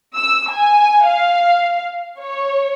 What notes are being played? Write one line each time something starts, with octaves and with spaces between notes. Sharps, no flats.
E6
G#5
F5
C#5